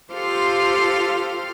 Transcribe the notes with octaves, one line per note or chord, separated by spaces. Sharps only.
F4 G4 A4 C5 F5 C6